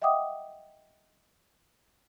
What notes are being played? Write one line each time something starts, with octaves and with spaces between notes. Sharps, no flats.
D#5 E5 F#5 G5 D6 D#6